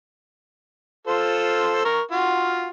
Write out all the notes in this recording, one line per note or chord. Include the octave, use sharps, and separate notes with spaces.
F4 A4 C5
A#4 C#6
F4 F#4